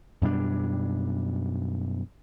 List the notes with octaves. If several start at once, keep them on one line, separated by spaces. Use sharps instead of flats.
F#2 B2 G3 D4